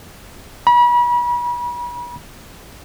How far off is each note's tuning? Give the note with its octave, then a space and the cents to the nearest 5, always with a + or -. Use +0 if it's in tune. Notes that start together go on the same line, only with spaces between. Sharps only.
B5 -40